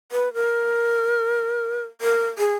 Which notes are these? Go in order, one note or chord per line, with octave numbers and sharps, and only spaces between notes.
B4
A#4
A#4
G#4